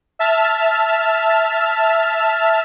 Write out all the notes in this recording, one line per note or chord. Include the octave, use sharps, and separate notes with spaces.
E5 A5 F6